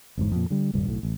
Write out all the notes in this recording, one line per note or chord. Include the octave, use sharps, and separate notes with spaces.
G1 E2 G#2
F2 A#2
D3 G3
D#1 C2 G2 D3
B1 A2
A1